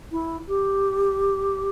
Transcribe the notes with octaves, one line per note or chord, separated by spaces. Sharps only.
E4
G4